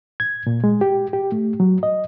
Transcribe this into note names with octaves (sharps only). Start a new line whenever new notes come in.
G#6
A#2
G#3
G4
G4
A3
F#3
D#5